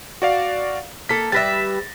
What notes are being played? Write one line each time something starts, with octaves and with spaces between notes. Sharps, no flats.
F#4 D5 F5
A#3 A4 B6
G3 B4 E5 A6 A#6